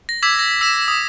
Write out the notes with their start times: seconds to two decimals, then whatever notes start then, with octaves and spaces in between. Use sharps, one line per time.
0.09 A#6
0.23 D6 E6 G#6 B6
0.39 A#6
0.61 E6 B6 E7
0.88 D#6